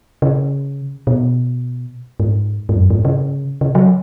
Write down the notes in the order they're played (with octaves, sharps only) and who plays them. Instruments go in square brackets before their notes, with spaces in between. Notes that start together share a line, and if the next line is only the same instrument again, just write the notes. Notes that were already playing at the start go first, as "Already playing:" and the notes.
[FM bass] C#3
B2
G#2
G#2
F#2
G#2
C#3
C#3
F#3